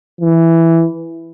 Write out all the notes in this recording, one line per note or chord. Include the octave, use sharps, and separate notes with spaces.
E3